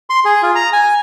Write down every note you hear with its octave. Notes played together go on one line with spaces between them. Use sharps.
C6
G#4
F4
A#5
G#5